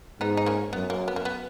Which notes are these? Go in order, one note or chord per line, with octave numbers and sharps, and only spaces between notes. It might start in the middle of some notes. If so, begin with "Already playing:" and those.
G#2 B3 D#4
D#4
A#3 C#4
F#2 B3
A#3
B3
A#3
B3